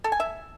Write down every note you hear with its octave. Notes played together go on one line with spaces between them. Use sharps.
A4
G#5
E5